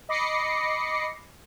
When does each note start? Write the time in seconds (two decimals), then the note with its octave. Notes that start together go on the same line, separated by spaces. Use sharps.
0.09 D#5 B5 D6 A#6 C7 C#7